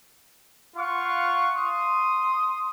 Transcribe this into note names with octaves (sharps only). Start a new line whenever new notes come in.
F4 F5 F#5 C#6
C6 D#6